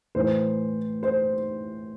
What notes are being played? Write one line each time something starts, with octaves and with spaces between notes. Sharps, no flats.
A2 E3 C5
C5